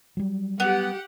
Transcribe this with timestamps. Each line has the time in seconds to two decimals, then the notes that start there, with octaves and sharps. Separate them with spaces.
0.17 F#3 G3
0.60 B3 G4 F#5